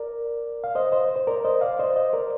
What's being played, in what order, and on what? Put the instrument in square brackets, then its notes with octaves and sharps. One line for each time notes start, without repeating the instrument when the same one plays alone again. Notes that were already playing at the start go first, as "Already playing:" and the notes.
Already playing: [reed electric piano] A#4 D5
F5
C5 D#5
C5 D#5
C5
A#4 D5
C5 D#5
D5 F5
C5 D#5
C5 D#5
A#4 D5